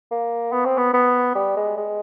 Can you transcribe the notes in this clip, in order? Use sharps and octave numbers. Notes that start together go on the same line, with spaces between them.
A#3
B3
C4
B3
B3
G3
G#3
G#3